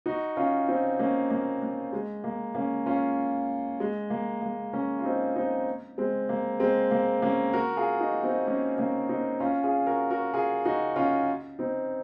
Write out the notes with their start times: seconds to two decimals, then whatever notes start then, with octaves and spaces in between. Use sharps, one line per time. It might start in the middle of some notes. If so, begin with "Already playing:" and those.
0.06 D#4 F#4
0.37 C#4 F4
0.68 C4 D#4
0.99 A#3 C#4
1.30 A#3
1.62 A#3
1.93 G#3
2.24 A#3
2.55 A#3 C#4
2.86 C#4 F4
3.80 G#3
4.10 A#3
4.42 A#3
4.73 A#3 C#4
4.99 F4
5.04 C4 D#4
5.35 C4 D#4
5.98 G#3 C4
6.29 A#3
6.60 G#3 C4
6.91 A#3
7.22 A#3 C#4
7.53 F#4 A#4
7.77 F4 G#4
8.00 D#4 F#4
8.23 C4 D#4
8.47 A#3 C#4
8.78 A#3 C#4
9.09 C4 D#4
9.40 C#4 F4
9.64 F4 G#4
9.86 F#4 A#4
10.10 F#4 A#4
10.34 F4 G#4
10.65 D#4 F#4
10.96 C#4 F4
11.59 C4 D#4